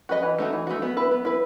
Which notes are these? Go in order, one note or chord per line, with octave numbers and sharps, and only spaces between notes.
F#4 B4 D#5
E3
A3 D#4 F#4
E3
A3 D#4 F#4
B3
E4 B4
B3
E4 B4